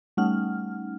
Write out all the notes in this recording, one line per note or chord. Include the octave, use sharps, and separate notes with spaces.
G3 A3 C#4 D#4 F#5 F6